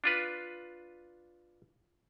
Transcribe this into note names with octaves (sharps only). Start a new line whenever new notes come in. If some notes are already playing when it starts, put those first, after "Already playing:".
D4 F4 B4